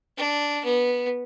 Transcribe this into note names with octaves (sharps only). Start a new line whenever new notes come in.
D4
B3